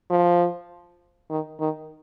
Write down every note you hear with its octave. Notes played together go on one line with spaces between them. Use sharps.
F3
D#3
D#3